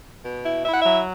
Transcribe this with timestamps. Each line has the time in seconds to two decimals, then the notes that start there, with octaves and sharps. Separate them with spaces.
0.23 B2
0.44 E4
0.65 E4 E5
0.72 F#5
0.81 F#3 E5